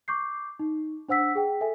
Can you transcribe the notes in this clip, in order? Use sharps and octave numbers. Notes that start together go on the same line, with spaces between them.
C#6 D6 G6 C7
D#4
D4 C5 F#5 E6 B6
G#4 G5
A4 E5 G#5